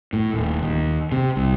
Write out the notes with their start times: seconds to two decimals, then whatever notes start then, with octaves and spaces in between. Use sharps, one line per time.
0.13 A2
0.34 D#1
0.63 D#2
1.12 C3
1.36 C2